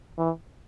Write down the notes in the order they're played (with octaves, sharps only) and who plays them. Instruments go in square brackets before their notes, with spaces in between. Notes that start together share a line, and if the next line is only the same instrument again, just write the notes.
[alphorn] E3